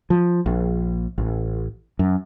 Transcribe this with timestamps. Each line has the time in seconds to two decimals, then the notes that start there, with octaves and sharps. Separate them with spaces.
0.10 F3
0.46 A#1
1.18 A1
1.99 F#2